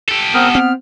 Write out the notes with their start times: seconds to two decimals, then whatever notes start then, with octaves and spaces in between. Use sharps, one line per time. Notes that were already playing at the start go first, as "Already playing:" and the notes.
0.09 G4 A4
0.34 B3 C4 A#4 D#6
0.55 C4 F6